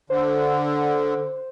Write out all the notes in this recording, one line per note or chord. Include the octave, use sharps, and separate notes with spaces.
D3 C5